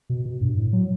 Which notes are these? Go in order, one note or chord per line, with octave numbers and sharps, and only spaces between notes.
B2
B2
G2
A2
F#3